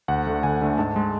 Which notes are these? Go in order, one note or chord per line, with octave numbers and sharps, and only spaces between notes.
D2 F#5
D3 A3
D2 G#5
D3 A3
G#2 A5
G#3